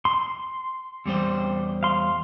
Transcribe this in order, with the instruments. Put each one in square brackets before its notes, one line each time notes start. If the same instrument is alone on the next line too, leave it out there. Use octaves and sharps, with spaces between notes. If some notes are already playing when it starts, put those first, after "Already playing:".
[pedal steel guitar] C6
[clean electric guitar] E2 G3 C5
[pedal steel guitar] F5 C6